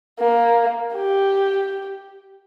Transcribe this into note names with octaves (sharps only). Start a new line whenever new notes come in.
A#3
G4